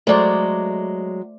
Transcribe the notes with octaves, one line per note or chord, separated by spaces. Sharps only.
F#3 G#3 A3 C5 D5